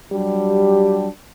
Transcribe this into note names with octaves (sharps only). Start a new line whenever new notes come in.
F#3 G3 D4 G4